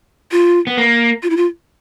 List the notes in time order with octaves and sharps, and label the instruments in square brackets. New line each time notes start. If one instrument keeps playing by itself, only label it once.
[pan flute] F4
[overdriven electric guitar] B3
A#3
[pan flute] F4
E4
F4